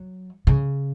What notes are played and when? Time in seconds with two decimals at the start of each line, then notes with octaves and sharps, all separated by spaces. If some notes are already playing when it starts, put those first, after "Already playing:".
Already playing: F#3
0.47 C#3